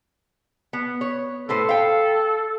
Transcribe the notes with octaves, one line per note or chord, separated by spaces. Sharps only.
B3
C#5
A2 A4 B4 C5
F5 G5